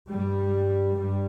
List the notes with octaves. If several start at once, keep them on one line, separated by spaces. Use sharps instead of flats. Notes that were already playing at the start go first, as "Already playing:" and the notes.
G2 G3
G2 G3